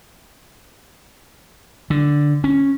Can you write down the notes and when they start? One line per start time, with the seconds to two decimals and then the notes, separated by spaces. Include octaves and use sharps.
1.90 D3
2.44 C#4